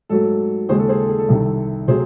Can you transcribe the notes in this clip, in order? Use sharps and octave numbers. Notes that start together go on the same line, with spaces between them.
G#2 F#3 A3 A4
D#2 C#3 G#3 G#4 C5
A4
G#4 C5
A4
G#4
A4
C2 C3 D#3
C3 F#3 A3 G#4 C5